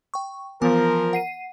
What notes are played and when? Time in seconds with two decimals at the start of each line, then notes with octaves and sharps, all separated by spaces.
0.14 G5 C#6
0.62 E3 F3 B3 A#4 G#5
1.13 F#5 C7 D#7